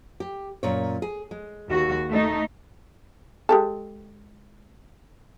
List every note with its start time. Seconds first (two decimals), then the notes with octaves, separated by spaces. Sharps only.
0.20 G4
0.63 F#2 A#2 C#5
1.02 G#4
1.31 G#3
1.69 D#2 F#4
2.09 A3 D#4
3.49 G#3 G4 A4